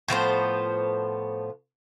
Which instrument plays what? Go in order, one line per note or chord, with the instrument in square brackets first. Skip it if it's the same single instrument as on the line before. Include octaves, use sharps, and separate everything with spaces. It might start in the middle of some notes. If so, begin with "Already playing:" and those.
[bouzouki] A2 F3 B3 C5